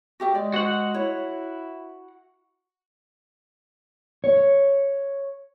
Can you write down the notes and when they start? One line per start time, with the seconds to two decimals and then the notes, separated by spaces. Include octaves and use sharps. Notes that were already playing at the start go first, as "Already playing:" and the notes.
0.20 F#4 G4 E5
0.35 G#3 D5
0.54 F#4 C5 F#5
0.94 E4 C#5
4.24 C#5